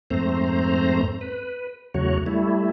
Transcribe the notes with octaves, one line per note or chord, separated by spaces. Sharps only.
F2 G#2 A3 C4 C5 A#5
B4
E2 C#3 F#3 A3 F#4 C#5
G3 A3 E4